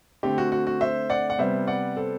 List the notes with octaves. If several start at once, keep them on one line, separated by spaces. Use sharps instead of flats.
D3 A3 C4 G4
F#4
F#4
F#4
C5 E5
D5 F#5
F#5
C3 G3 B3 C5 E5
D5 F#5
A4 C5